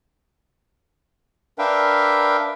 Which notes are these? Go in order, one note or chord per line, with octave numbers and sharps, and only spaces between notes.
D4 A#4 B4 E5 F5 G5